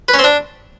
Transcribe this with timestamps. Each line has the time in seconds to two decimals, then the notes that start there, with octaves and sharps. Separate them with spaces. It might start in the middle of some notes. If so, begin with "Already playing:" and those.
0.08 B4
0.14 C#4
0.19 C4
0.24 D4